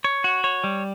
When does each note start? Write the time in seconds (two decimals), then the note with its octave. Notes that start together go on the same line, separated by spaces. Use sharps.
0.04 C#5
0.24 F#4
0.44 C#5
0.64 G3